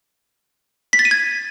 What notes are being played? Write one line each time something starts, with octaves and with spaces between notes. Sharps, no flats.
B6
A6
D#7
G#6